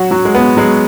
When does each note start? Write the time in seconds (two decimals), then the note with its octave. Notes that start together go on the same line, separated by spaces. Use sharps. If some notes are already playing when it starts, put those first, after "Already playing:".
Already playing: F#3 F#4
0.11 F#3 F#4
0.25 G#3
0.35 B3
0.57 F#3 G#3